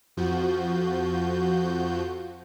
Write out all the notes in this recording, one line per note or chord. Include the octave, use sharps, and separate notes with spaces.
F2 F3 F#4 G6